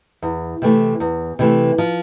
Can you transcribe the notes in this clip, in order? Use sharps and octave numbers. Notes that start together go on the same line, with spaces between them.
E2
C3 E3 A3
E2
C3 E3 A3
F3